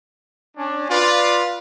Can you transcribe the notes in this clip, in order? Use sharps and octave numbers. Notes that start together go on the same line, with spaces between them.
C#4 D4
F4 B4 D5